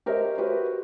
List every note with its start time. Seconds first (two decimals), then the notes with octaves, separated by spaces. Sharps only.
0.06 G4 A#4 C5 C#5 D#5 E5
0.38 F#4 G4 B4 C5